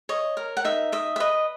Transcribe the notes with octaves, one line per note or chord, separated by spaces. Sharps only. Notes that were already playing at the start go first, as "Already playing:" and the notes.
C#5 D#5
A#4
F#5
D#4 E5
D#5 E5
E5
B4 D#5